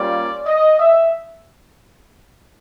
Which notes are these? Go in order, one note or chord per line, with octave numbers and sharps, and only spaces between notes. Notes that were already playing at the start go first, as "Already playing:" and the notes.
Already playing: G3 A#3 C#4 F4 D5
D#5
E5